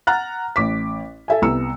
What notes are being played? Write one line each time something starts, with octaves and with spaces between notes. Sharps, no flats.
F#5 A#5 F6 F#6 A6
A1 D6 B6
A4 E5 G#5
C2 B3 A#5 E6 C#7